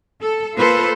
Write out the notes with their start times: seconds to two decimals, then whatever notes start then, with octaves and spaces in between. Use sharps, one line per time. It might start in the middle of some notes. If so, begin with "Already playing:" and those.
0.20 A4
0.57 A#3 F4 A4 B4 C5